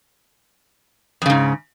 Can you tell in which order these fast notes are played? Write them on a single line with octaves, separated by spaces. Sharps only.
F2 C#3 G#2